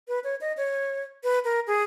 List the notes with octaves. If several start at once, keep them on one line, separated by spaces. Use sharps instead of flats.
B4
C#5
D#5
C#5
B4
A#4
G#4